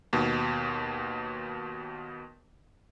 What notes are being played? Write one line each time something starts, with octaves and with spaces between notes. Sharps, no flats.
D#2 B2